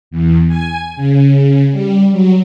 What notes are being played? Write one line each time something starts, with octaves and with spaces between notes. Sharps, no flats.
E2
G#5
C#3
G3
F#3